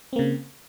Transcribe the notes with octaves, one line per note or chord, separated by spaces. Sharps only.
C#3 A#3 C4